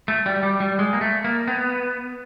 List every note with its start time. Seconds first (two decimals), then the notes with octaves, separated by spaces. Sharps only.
0.08 A3
0.26 G3
0.43 G3
0.60 G3
0.79 G#3
0.93 A#3
1.01 A3
1.24 A#3
1.48 B3